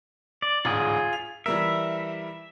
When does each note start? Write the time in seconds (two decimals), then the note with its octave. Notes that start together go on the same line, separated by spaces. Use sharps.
0.42 D5
0.65 A1 D2 G#2 F4 G#4
1.13 F7
1.46 E3 G3 A#4 E5